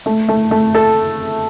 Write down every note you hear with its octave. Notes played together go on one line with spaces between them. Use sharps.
A3
A3
A3
A4